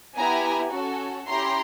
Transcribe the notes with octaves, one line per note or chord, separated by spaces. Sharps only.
B3 E4 G4 G#5 A#5
C#4 F#4 A4
C#4 E4 G4 A#5 C6